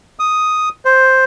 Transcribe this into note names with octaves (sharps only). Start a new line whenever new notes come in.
D#6
C5